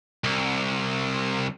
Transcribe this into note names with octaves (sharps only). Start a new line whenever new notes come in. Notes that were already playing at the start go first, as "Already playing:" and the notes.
C2